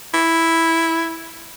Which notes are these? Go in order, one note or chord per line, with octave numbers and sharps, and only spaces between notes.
E4